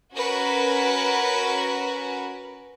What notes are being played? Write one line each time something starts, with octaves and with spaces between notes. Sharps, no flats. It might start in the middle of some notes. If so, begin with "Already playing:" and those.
C#4 F#4 A#4 B4